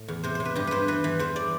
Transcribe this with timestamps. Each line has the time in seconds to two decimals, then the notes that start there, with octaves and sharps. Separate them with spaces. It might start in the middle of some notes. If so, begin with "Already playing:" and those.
Already playing: A2
0.08 E2
0.23 C3 C5
0.35 C3 C5
0.45 B4
0.56 G2 G4
0.67 G2 B4 C5
0.88 E3 B4
1.04 E3
1.19 E2 C5
1.36 D5